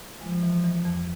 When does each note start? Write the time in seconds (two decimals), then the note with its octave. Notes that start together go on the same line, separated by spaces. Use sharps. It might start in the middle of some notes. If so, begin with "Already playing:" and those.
0.21 F3 G#3
0.43 E3
0.64 E3
0.85 F2